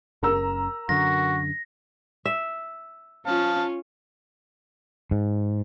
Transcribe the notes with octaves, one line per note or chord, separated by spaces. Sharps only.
F#1 C#3 A#4 A#5 E6
F#2 D3 F#4 A#6
E5
C#4 F4 F5 A5
G#2